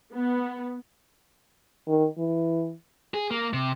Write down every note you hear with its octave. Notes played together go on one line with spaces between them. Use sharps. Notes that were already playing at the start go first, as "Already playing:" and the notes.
B3
D#3
E3
G#4
A#3
C3